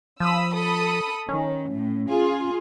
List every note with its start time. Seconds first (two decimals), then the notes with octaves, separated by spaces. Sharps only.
0.20 F3 B5 D#6 E6
0.53 A4 B5 D#6
1.29 D#3 C#4
1.72 A2
2.10 F4 G#4